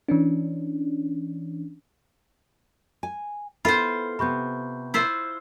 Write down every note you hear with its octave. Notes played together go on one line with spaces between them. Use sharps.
E3 C#4 D4
G#5
B3 E4 F4 A4 C5 B5
C3 B3 B5 C#6 G6
E4 F4 C5